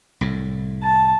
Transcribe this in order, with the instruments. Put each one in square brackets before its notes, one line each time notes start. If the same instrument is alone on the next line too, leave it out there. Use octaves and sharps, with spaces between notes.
[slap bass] C2 A2
[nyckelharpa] A5